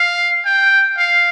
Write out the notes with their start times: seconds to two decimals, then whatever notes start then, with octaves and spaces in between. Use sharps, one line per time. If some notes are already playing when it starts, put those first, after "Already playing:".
Already playing: F5
0.45 G5
0.98 F5